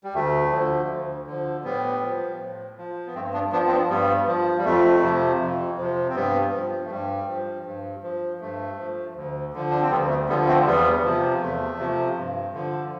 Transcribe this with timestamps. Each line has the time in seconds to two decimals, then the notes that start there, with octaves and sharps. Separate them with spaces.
0.04 G3
0.14 D2 A3
0.51 D3 F3
0.89 D2
1.27 D3 F3
1.64 A2 G3 B3
2.02 F3
2.40 A2
2.78 F3
3.07 B3
3.14 G2 A3 C4
3.34 B3 D4
3.52 F3 B3 D4
3.67 C4
3.71 B3 D4
3.90 G2 G3 B3
4.27 F3
4.58 G3
4.65 F2 A3
5.02 C3 F3
5.40 F2
5.78 C3 F3
6.10 C4
6.15 G2 G3 B3
6.53 F3
6.84 A3
6.90 G2 G3
7.28 F3
7.65 G2
8.03 F3
8.41 G2 A3
8.78 F3
9.16 D2
9.53 D3 F3
9.71 D4
9.81 C4
9.91 D2 G3 B3
10.09 A3
10.28 D3 F3 G3 B3
10.47 A3 C4
10.66 E2 G3 B3
11.04 C3 F3
11.41 E2 A3
11.79 C3 F3
12.16 G2
12.54 D3 F3